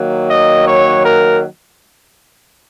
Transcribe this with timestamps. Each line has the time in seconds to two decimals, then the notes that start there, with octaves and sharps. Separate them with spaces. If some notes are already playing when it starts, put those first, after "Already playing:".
Already playing: D#3 F#3 A#3
0.27 D#5
0.65 C#5
1.04 A#4